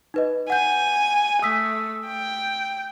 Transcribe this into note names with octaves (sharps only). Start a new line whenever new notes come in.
D#4 B4 D#5
F#5 G#5 G6
A3 D#6 E6 B6
G5